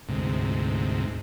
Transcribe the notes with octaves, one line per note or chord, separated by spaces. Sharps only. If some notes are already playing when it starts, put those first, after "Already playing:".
D2 G#2 C3